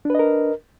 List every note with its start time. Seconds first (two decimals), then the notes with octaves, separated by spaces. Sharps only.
0.05 D4
0.10 B4
0.15 D#5
0.19 A#4